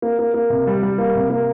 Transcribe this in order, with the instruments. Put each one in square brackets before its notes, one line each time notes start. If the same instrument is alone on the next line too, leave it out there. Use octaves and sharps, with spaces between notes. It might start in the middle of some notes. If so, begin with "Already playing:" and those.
[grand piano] A#3
A#3
A#3
C3
G3
G3
A#3
C3
A#3